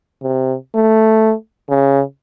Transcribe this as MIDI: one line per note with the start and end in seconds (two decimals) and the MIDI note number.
0.22 0.55 48
0.75 1.33 57
1.70 2.01 49